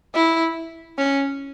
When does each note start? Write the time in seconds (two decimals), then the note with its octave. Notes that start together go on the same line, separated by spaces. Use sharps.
0.15 E4
0.98 C#4